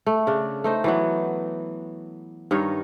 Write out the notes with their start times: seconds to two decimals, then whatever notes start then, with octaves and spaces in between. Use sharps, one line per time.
0.06 A3
0.27 C#3 D4
0.64 A3 D#4 C5
0.84 E3 F#3 B3
2.51 G2 D#3 D#4 C#5